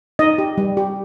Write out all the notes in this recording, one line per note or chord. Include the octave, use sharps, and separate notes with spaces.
D#4 D#5
G4
G3
G4